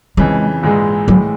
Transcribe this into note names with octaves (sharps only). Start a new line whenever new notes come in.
F2 C#3 E3 G#3
A#1 G#2 E3 G#3
A2 E3 F#3 G#3